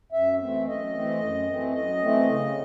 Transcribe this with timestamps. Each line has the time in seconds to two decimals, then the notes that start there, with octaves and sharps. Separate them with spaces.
0.12 F#2 E5
0.39 E3 A3 C4 E5
0.66 F#2 D#5
0.93 E3 A3 C4
1.20 F#2
1.47 E3 A3 C4
1.73 F#2 D#5
2.01 E3 A3 C4
2.27 C#3